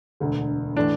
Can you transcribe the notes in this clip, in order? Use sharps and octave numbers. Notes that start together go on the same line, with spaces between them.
E1 D2 D3
A2 E3 D4